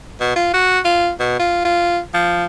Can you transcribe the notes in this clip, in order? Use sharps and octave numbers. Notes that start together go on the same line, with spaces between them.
B2
F4
F#4
F4
B2
F4
F4
F3